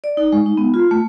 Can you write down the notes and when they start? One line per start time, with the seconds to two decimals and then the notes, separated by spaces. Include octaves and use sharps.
0.04 D5
0.17 D#4
0.32 G#3
0.46 D#4
0.58 B3
0.74 F4
0.91 A3